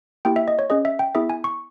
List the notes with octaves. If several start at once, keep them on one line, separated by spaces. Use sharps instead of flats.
A#3 E4 G4 G5
E5
D#5
C#5
C#4 G#4 D#5
E5
G5
B3 E4 G#4 E5
G#5
C#6